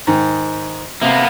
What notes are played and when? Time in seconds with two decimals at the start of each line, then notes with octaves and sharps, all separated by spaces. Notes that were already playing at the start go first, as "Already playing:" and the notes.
0.07 G#2 D#3
1.01 C3 A#3 B3